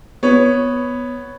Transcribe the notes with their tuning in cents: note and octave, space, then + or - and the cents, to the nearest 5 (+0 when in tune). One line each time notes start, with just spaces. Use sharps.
B3 +0 C#5 +0